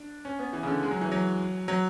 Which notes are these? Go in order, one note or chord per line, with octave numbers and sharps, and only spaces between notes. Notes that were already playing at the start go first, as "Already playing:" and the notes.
Already playing: D4
C#4
B3
E3
C#3
D3
G#3
F#3
E3
F#3
F#3